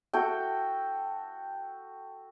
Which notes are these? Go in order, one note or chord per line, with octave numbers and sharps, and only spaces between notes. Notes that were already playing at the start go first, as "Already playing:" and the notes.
F#4 A4 G5